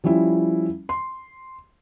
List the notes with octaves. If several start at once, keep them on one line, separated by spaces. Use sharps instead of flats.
F3 G3 C#4 E4
C6